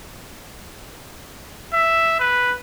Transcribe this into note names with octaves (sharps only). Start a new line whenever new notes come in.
E5
B4